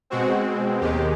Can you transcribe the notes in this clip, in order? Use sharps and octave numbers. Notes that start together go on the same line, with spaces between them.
B2 G#3 C4 F#4
D#2 D#3 G#3 G4